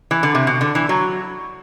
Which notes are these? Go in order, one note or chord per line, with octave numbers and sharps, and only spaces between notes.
E3
D3
C3
B2
D3
E3
F#3